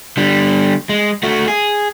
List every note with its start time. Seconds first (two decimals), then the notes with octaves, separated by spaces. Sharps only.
0.17 D3 G3
0.89 G#3
1.23 A3 F#4
1.48 G#4